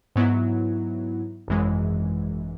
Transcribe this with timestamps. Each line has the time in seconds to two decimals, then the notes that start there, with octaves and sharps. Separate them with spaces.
0.16 G#2 F#3 B3 E4
1.48 G#1 F#2 E3 G#3